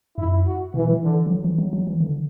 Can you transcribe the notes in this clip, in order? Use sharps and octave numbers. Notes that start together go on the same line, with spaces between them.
F#2 E4
F#4
B2 E3
E3
D3
E3
F#3
E3
F#3
F#3
E3
D3